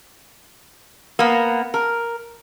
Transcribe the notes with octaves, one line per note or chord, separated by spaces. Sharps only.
A#3 B3
A#4